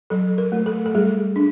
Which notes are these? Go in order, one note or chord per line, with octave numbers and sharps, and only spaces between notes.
F#3 A4
A#4
A3
A4
A4
G3 G#4
D4